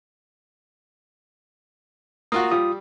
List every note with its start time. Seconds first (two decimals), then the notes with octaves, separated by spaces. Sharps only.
2.32 A#3 F4 F#4 D#6
2.51 G3 F4 D#6